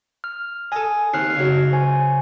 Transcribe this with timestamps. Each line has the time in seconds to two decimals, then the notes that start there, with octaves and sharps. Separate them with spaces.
0.24 F6
0.72 A4 D#5 G#5
1.14 D#2 C4 F6 F#6 C7
1.36 C#2 F#3
1.73 C5 G#5